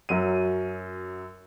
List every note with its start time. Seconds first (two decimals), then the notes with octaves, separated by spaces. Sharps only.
0.09 F#2 F#3 D#7